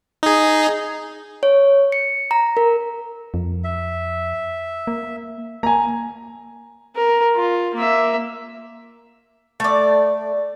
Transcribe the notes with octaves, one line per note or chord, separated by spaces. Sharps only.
D#4 G#4
C#5
C#7
A#5
A#4
F2
E5
A#3
A#3 G#5 A#5
A#4
F4
A#3 E5
A3 D5